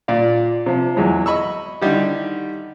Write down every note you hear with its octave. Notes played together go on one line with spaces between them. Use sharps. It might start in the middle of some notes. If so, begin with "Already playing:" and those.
A#2 D5 F5
C3 F3
E2 F#3 G#3 E4
D#5 B5 C#6 E6
D3 D#3 G3 D#4 E4 G4